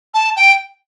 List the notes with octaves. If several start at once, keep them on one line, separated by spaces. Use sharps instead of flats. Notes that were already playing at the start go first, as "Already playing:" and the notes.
A5
G5